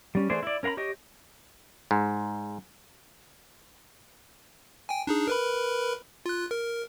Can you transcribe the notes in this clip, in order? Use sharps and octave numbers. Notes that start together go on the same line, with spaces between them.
G3 C#4
E3 A3 G#4 C5 D5
E4 D5
C#4 A#4 F5 A#5 B5
G4 C#5 D#5 G5
G#2
G5 G#5
D4 D#4 G#4
A#4 B4 B5
F4 F#6
A#4